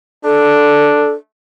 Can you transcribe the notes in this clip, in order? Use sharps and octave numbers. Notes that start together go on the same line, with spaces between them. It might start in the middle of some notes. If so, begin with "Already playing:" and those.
D4 A4